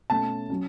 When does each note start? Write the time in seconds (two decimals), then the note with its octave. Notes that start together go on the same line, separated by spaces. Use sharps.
0.10 B2 A3 C#4 A5
0.50 F#3 C#4